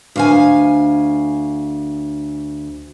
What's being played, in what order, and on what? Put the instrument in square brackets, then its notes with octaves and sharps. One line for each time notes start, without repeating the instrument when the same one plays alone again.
[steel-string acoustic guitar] D2 F5 G#5